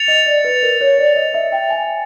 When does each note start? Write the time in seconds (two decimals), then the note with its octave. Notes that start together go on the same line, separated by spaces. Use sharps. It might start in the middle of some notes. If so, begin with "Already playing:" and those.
Already playing: A6 C#7 F7
0.08 D#5
0.26 D5
0.44 B4
0.63 A#4
0.81 C#5
0.98 D5
1.16 D#5
1.34 E5
1.52 G5
1.70 G#5